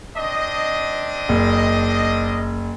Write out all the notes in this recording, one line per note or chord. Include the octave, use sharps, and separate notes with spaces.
C4 D4 D#5
F#1